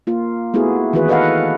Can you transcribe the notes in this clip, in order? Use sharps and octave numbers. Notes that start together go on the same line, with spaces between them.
A#3 F4
A3 B3 E4 F#4 G#4
D#3 E3 E4 F#4 G#4 B4
A4 B4 D#5 F5 F#5